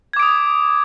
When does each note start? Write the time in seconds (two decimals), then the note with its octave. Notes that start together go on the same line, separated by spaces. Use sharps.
0.13 G#6
0.16 D6
0.20 D7
0.23 D#6